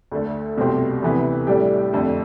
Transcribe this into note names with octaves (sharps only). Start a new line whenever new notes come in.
D2 D3 A3
C2 B2 A3 C4 G4
D2 C3 E3 B3
A2 G3 D4 G4
F2 D3 A3